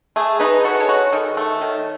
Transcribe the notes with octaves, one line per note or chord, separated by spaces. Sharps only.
A3 G#4
D#4 G#4 B4
F#4 A4 C#5
D#5
A4 C#5
F#4
D#3 A4 C#5
A3
D#3